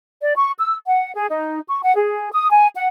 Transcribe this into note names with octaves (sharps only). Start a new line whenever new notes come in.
D5
C#6
E6
F#5
G#4
D#4
C#6
F#5
G#4
D#6
G#5
F#5